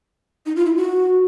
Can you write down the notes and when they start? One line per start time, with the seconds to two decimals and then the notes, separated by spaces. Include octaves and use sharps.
0.46 D#4
0.56 F4
0.66 E4
0.76 F#4